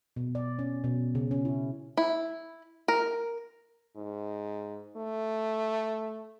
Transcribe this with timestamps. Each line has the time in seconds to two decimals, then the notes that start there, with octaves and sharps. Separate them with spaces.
0.16 B2
0.35 D5
0.59 C#4
0.84 B2
1.15 C#3
1.31 C#4
1.45 E4
1.97 E4
2.88 A#4
3.96 G#2
4.97 A3